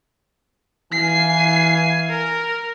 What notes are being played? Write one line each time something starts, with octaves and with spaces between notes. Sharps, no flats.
E3 F5 G#5 C7
A#4